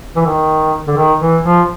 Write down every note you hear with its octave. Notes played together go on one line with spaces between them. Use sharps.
E3
D#3
D3
D#3
E3
F3